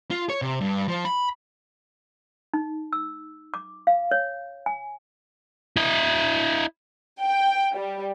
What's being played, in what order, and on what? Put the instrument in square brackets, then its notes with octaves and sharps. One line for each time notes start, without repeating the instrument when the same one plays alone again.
[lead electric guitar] F4
C#5
C3
G2
F3
B5
[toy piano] D#4
E6
D6
F5
C#5
G#5
[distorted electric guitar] E4 D#5
[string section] G5
G3